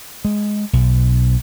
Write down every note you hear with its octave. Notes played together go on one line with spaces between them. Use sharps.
G#3
B1